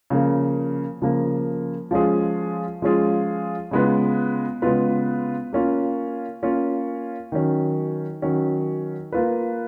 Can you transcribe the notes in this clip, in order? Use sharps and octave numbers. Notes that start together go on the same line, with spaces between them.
C#3 F3 A#3
C#3 F3 A#3
F3 G#3 C#4 F4 G#4
F3 G#3 C#4 F4 G#4
C#3 G#3 B3 F4 B4
C#3 G#3 B3 F4 B4
A#3 C#4 F4
A#3 C#4 F4
D#3 F#3 C#4
D#3 F#3 C#4
A#3 F4 B4